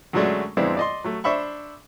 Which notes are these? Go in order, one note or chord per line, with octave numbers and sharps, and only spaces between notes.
F#2 D3 F#3 G#3 A3 D4
F2 G#3 B3 C4 D4 E4
D5 D#5 C6
F#3 A3
D4 C5 E5 B5 C#6